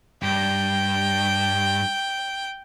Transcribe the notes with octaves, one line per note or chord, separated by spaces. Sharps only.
G2 G5